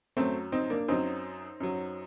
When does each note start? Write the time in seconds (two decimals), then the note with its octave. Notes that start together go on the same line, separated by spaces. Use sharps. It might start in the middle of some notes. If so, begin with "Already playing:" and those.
0.17 F#2 F#3 A3 C4
0.52 C4 D#4
0.70 A#3 D4
0.88 F#2 F#3 C4 D#4
1.60 F#2 F#3